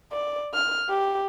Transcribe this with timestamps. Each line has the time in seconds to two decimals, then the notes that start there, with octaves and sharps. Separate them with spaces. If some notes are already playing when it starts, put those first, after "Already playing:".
0.12 D5
0.54 F6
0.89 G4